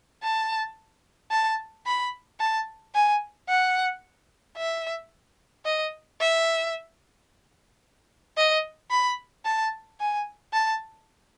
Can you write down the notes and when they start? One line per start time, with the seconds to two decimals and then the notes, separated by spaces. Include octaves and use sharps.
0.23 A5
1.31 A5
1.87 B5
2.40 A5
2.95 G#5
3.49 F#5
4.57 E5
5.65 D#5
6.21 E5
8.37 D#5
8.91 B5
9.45 A5
10.00 G#5
10.53 A5